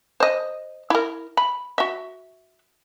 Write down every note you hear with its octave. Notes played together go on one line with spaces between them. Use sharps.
C5 D#5
E4 A#4
B5
F#4 E5